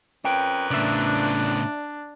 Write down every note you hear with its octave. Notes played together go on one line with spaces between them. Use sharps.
F2 C#4 A#4 B4 G5
A2 C#3 D4 D5 E5